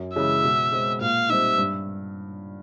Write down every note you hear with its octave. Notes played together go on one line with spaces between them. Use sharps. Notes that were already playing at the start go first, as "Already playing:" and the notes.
Already playing: F#2
C#3 E3 G#3 E5
B2
G#3 C4
A#2 F5
G3 C4 D#4 E5
G2